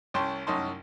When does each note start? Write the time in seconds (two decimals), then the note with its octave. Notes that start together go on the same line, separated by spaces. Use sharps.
0.14 C2 C#4 G5 A5 C6
0.47 C2 F#2 C#4 D#4 A5 C6